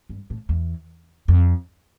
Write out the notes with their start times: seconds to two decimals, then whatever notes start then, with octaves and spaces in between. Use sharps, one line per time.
0.09 G2
0.30 A2
0.49 E2
1.28 F2